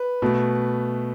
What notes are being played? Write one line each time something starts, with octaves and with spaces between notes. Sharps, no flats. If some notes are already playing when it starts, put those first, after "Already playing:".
Already playing: B4
B2 A3